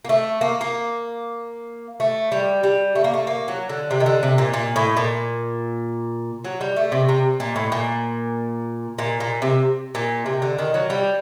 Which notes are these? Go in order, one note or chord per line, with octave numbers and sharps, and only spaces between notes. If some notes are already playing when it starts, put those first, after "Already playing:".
A#3
A3
A#3
A#3
A3
G3
G3
A3
A#3
A3
A#3
F#3
D3
C3
D#3
D3
C3
A#2
A#2
A2
A#2
F#3
G3
A3
C3
C3
A#2
A2
A#2
A#2
A#2
C3
A#2
C3
D3
D#3
F#3
G3